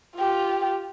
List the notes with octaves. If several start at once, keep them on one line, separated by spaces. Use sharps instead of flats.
F4 G4